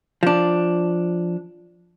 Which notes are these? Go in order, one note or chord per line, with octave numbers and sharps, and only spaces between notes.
F3 D4